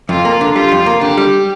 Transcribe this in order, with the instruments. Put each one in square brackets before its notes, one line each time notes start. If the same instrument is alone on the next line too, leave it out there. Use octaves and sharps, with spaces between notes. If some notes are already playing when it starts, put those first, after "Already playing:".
[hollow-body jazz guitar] F2 [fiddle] F4
[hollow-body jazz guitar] A#3
D3
[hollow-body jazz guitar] G3 [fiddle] F4
[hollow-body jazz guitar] F2
A#3
[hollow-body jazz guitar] D3 [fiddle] G4
[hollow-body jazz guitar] G3